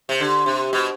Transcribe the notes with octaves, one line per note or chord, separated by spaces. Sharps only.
C3
D3
C3
B2